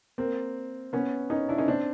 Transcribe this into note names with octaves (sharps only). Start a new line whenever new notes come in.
A#3 C4
B3 C#4
C#4 D#4
D4 E4
C#4 D#4
C4 D4